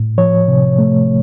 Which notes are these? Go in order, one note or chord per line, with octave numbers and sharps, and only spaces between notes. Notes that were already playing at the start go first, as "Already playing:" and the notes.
Already playing: A2
F3 C#5
C3
A3